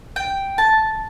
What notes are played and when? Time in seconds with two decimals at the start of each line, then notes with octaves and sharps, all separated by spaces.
0.16 G5
0.58 A5